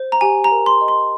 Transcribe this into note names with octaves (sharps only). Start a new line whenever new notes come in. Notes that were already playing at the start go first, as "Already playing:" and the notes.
Already playing: C5
A#5
G4 G#5
A#5
A#4
C6
D#5
C6